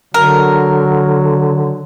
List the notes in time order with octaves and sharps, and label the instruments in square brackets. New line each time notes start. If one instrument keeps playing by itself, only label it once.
[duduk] D3 [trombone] F#3 [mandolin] A#4